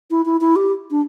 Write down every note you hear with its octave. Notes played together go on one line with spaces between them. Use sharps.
E4
E4
E4
G4
D4